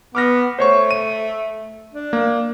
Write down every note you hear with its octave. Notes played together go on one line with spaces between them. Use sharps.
B3 D6 F6 A#6
A3 C5 C#5 C#6
D#7
D4
A#3